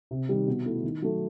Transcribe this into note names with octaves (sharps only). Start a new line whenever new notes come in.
C3
D#3 G3
B2
A3 E4
D#3
F#3 A3